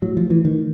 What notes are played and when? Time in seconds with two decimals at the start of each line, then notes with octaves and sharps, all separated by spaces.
0.02 A2 F#3
0.17 F3
0.30 E3
0.45 D#3